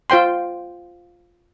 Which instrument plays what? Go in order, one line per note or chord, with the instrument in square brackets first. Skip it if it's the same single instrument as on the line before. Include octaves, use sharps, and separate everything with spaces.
[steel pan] F4 C5 G5 C6